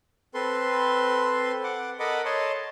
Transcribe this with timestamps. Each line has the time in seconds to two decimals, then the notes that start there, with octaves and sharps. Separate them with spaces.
0.34 C4 A4 B4 C6
1.64 F#5 D6
2.00 A4 A#4 D#5 F#5 B5 D6
2.25 C#5 D#5 A5 C6